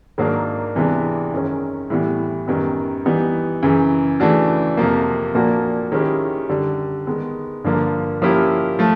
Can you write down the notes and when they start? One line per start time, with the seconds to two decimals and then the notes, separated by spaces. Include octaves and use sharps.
0.18 G#2 D#3 F#3 A#3 D4
0.76 C3 E3 G#3 B3 D4
1.33 F#2 D#3 G#3 C#4
1.90 A2 E3 G3 B3
2.48 F#2 D#3 G3 B3
3.05 E3 G3 B3 D#4
3.63 F#2 C#3 E3
4.20 C#3 E3 A3 D4 F#4
4.77 F2 C3 F3 A#3
5.35 A#2 F3 A#3 D4 F#4
5.92 D#3 G#3 C#4 E4 G4
6.49 F#2 D3 G3
7.07 D#3 G#3 B3
7.64 G2 D3 F3 A#3
8.22 F3 A#3 C#4 E4 G4
8.79 F3 A3